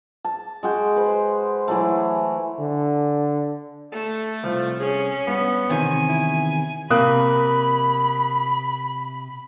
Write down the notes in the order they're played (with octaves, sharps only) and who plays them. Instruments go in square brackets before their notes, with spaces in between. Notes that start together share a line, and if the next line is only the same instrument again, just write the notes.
[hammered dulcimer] A5
G#3 F#4 G5
B4 C5
E3 F#3 A3
[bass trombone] D3
[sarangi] A3 [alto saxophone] A4
[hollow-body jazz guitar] C2 [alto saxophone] F3
[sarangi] C#4 [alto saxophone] G#4
[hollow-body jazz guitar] G2 [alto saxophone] B3
[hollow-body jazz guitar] E2 C3 D#3 [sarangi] G#5
[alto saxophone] E4
[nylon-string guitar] C3 [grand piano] A#3 D#6 F#6 [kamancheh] B5